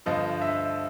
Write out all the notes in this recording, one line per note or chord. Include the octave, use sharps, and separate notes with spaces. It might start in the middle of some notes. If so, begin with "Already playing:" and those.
G2 D3 F3 D#5
E5